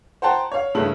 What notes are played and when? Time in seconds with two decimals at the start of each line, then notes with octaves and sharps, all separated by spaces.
0.22 C5 F#5 G5 A5 A#5
0.52 C#5 F5
0.75 G2 C#3 A3 E4 F#7